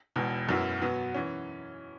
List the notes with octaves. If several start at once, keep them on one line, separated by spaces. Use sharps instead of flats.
E1 E2 B2
F#2 F#3 B3 E4
B2 F#3 B3
E3 C#4